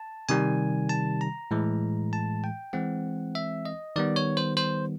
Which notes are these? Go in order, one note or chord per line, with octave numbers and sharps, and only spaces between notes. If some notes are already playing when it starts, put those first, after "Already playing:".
Already playing: A5
C3 D#3 G3 G#5
A5
A#5
A2 E3 G#3
A5
G5
E3 G#3 C4 F#5
E5
D#5
D#3 G3 B3 D5
C#5
C5
C5